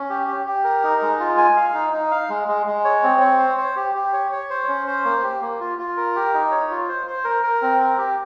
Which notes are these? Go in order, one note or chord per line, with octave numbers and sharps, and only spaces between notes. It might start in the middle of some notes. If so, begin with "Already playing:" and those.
Already playing: C#4
G4
G4
G4
A#4
D#4
G#3
F4
G#5
F5
D#4
D#4
F5
G#3
G#3
G#3
C#5
C4
C#5
C5
C5
G4
G4
C#5
C#5
C5
C#4
C5
A#3
G4
A#3
F4
F4
A#4
G4
D#4
C#5
F4
C5
C5
A#4
A#4
C4
A#4
G4